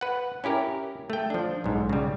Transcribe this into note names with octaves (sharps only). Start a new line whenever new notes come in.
B4 F#5
C#4 E4 G4 A#4
A3 G5
F3 D4
B1 G#2
C#3 G3